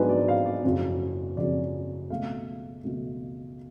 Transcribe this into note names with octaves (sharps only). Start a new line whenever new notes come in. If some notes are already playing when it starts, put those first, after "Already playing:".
Already playing: G#2 F#3 B3 D4 B4 G#5
D5
F5
D5
F#1 F2 C#3 F#3 C#4
F#1 F2 C#3 F#3 C#4 D5
C#2 B2 A3 F5
C#2 B2 A3